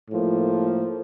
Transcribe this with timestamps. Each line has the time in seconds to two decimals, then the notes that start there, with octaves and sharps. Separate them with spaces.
0.10 A2 F3 A#3